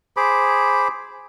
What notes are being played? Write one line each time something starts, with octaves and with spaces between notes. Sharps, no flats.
G#4 C5 B5 D6